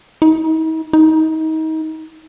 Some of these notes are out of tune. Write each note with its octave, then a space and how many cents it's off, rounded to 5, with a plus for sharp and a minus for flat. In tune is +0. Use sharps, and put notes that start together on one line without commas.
D#4 +45
D#4 +30